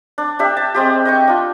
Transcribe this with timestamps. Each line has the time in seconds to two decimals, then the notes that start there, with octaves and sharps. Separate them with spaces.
0.18 D4
0.39 D4 G4 E5
0.57 A5
0.74 G#3 C4 G4
1.05 D#5 G5 C#6
1.28 D4 F4